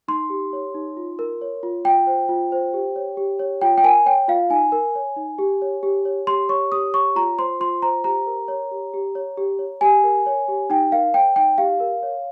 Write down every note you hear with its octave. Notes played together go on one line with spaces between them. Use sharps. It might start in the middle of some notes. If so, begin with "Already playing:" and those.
D#4 C6
G4
C#5
D#4
F4
A#4
C#5
F4
F4 G5
C5
F4
C5
G4
C#5
G4
C#5
F4 G5
G5
A#4 G#5
C#5 G5
F4 F5
D#4 G#5
A#4
C#5
D#4
G4
C#5
G4
C#5
G4 C6
C#5 C#6
G4 D#6
C#5 C#6
F4 A#5
C5 C6
F4 C6
C5 A#5
G4 A#5
A#4
C#5
G4
G4
C#5
G4
C#5
G4 G#5
A#4
C#5
G4
D#4 G5
A#4 F5
C#5 G5
D#4 G5
G4 F5
A#4
C#5